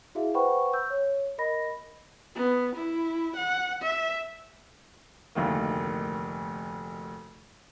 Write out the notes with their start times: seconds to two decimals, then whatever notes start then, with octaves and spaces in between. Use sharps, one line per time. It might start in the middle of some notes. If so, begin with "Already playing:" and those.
0.15 E4 F#4 G#4 E5 F5
0.34 B4 C5 F#5 G5 B5 C#6
0.73 E6 G6
0.90 C#5
1.38 A#4 D#5 B5 A#6
2.35 B3
2.75 E4
3.36 F#5
3.82 E5
5.35 F1 D2 D#3 A#3